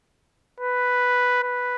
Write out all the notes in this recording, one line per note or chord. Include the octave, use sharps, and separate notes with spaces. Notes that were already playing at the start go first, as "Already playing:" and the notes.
B4
B4